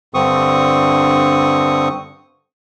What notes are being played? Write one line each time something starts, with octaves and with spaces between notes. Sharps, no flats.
G2 D3 C4 C#6 D#6